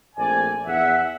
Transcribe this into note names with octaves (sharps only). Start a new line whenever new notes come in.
A#1 A3 C4 D5 G#5
E2 E5 F#5